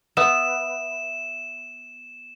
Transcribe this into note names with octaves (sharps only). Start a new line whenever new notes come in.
B3 E5 E7